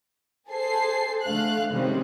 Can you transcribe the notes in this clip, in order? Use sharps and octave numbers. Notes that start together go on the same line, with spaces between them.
G#4 A4 C5 C7
D3 A3 F5 F#6
C3 D#3 G3 G#3 C4 C#4